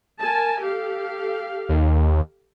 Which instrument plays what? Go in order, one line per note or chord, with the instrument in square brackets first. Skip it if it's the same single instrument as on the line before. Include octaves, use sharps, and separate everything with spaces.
[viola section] A#4 G#5 A5
G4 A4 F5
[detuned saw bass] D#2